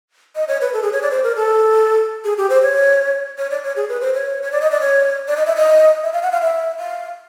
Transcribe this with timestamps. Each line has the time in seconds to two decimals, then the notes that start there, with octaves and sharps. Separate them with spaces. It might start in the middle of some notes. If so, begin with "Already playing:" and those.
0.36 D#5
0.48 C#5
0.61 B4
0.73 A4
0.83 G#4
0.93 C#5
1.02 D5
1.11 C5
1.24 A#4
1.36 A4
2.25 G#4
2.38 G4
2.50 C5
2.62 C#5
3.38 C#5
3.51 D5
3.63 C#5
3.76 G#4
3.89 B4
4.01 C5
4.14 C#5
4.43 C#5
4.52 D5
4.61 D#5
4.71 D5
4.81 C#5
5.28 D5
5.37 D#5
5.46 E5
5.56 D#5
6.03 E5
6.13 F5
6.23 F#5
6.32 F5
6.42 E5
6.79 F5